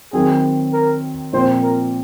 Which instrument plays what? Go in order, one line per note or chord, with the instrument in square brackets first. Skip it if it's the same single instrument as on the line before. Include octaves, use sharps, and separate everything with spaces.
[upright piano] D#3 F#3 C4 [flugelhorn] G#4
[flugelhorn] A#4
[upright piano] A#2 F3 C4 [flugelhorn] C5
[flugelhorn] A#4